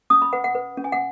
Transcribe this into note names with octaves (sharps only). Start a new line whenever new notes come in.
C#4 D#6
B5
B4 F#5
F#5
B4
C#4
G#5
F#5